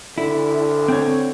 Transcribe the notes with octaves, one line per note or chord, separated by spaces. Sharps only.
D3 E4
C4 C#5